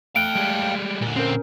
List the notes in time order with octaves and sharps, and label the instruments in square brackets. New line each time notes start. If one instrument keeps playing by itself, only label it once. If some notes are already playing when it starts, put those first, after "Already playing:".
[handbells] A3 F6 F#6 [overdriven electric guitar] F5 G5 [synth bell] D7
[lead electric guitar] G3 G#3
[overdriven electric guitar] A#2 D3
[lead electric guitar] C4 [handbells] C#4 A#4